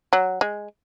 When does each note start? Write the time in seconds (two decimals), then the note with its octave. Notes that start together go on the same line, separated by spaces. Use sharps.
0.13 F#3
0.41 G#3